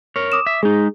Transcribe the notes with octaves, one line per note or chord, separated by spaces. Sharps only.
A#4 C#5
D6 D#6 E7
E5
G#3 D#4 G#4